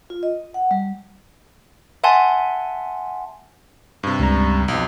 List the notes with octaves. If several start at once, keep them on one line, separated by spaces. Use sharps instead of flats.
F4
D#5
F#5
G3
E5 F#5 G#5 A5 C6
G2 C3
C#2 G3 A#5
B1 F2